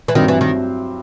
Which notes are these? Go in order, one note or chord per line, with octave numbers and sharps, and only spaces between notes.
E3
G2 D#3 F#3 C4
E3
D#3